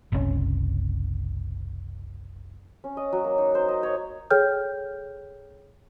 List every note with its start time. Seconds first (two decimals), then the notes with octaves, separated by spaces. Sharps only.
0.12 F#1 C2 A2 C#4
2.84 C#4
2.97 D#5
3.12 F#3
3.24 A#3
3.38 D#4
3.55 C5
3.68 D#5
3.83 C#5
4.30 G#4 A4 C#5 G5 F6 G6